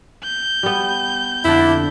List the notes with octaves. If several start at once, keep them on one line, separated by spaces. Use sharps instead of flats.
G6
G3 B3
F2 D3 D4 E4